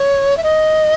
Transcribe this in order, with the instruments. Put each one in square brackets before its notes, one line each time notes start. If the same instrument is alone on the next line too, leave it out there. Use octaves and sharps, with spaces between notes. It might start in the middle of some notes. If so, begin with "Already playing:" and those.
Already playing: [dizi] C#5
E5
D#5